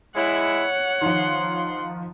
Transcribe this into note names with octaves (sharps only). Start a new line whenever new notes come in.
G#3 E4 C#5 F#5
D#3 F3 C6